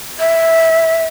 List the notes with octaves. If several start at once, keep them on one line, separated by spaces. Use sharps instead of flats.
E5